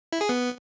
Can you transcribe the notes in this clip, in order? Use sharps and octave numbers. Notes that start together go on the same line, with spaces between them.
E4
G#4
B3